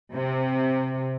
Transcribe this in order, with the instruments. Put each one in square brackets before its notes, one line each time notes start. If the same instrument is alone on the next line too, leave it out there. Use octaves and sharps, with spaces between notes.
[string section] C3